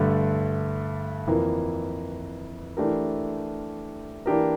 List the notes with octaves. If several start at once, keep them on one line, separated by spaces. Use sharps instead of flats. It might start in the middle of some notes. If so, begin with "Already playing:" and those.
Already playing: G2 D3 A3
F2 E3 A#3
E3 A3 D4 G4 A#4
E3 A#3 D4 G4 A#4